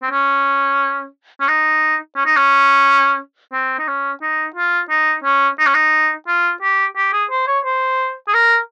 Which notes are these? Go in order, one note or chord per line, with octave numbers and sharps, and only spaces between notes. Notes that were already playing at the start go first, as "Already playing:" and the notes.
C4
C#4
C#4
D#4
C#4
D#4
C#4
C4
D#4
C#4
D#4
F4
D#4
C#4
D#4
C#4
D#4
F4
G4
G4
G#4
C5
C#5
C5
G#4
A#4